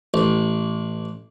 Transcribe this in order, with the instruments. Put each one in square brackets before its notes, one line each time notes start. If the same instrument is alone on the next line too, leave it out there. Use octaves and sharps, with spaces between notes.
[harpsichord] A1